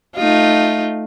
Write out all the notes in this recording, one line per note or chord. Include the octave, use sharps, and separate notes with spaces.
A3 D#4 F4